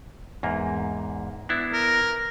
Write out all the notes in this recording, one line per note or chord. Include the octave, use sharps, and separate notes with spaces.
E2 G#2 A#3
B3 D4 E4
A#4